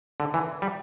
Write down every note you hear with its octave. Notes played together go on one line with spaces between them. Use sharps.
D3
E3
G3